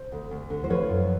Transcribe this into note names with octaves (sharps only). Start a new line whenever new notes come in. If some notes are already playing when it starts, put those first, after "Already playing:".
Already playing: C5
D2
D2
D3
C5
F3 B4 C#5
F#2